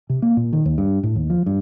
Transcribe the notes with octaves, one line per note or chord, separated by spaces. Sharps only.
C3
A#3
A#2
D#3
D#2
G2
A2
D#2
F3
G2